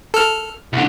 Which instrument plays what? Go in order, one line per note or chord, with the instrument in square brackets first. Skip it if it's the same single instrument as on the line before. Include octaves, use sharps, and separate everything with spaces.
[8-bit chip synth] A4 F6
[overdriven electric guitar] C2 D3